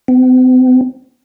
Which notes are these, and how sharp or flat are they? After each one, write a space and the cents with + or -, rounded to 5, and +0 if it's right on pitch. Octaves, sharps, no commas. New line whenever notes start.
C4 -45